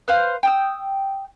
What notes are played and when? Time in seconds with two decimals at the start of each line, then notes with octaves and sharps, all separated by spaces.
0.08 B4 C5 F5
0.43 G5 D#6 E6